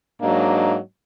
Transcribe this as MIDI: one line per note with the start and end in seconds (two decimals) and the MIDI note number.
0.22 0.78 44
0.22 0.78 54
0.22 0.78 58
0.22 0.78 62
0.22 0.78 75